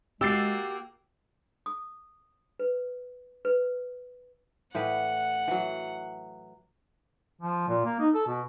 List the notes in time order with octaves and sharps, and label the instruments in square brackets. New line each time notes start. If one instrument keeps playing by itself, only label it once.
[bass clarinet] G#3 [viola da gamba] A#3 F#4 [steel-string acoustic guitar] G4 [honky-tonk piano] E6 A6 C7
[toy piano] D#6
B4
B4
[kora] A2 E3 B4 [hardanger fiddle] F#5
[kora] E3 F#3
[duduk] F3
A#2
A#3
D#4
A4
B2